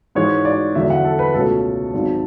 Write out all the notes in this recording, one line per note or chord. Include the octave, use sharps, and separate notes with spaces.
G#2 E3 G#3 C#5
D5
E2 D3 F#3 E5
F#5
A4
B4
C#2 B2 A3 C#4 A4
G#1 G#2 F#3